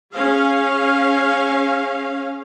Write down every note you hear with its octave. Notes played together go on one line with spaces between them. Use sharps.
C#4 G#4 F5